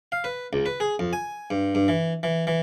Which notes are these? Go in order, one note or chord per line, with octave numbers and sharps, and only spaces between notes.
F5
B4
C#2
B4
G#4
F2
G#5
G2
G2
E3
E3
E3